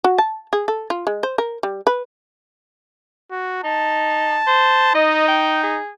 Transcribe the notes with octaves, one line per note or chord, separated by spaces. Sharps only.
F#4
A5
G#4
A4
F4
G#3
C5
A#4
G3
B4
F#4
D#4 A5
C5
D#4 D#5
G5
G#4